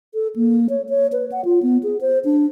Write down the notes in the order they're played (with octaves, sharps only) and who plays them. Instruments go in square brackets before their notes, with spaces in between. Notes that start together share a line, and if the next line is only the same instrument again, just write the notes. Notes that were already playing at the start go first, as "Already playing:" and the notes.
[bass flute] A4
A#3
C#5
C#5
B4
F#5
F4
B3
G#4
C5
D4